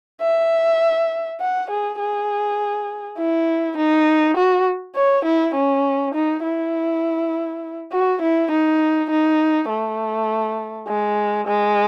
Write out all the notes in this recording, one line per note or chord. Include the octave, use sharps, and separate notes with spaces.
E5
F#5
G#4
G#4
E4
D#4
F#4
C#5
E4
C#4
D#4
E4
F#4
E4
D#4
D#4
A3
G#3
G#3